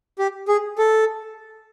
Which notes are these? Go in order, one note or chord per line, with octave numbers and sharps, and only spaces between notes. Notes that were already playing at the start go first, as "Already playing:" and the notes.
G4
G#4
A4